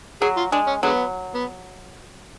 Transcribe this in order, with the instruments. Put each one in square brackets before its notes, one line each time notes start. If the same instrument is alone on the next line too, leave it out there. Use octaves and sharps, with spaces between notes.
[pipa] F#3 [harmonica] G#4
[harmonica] F4
[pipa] G#3 [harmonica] D4
[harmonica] C#4
[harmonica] D3 G#3 B3 [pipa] F#3
[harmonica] B3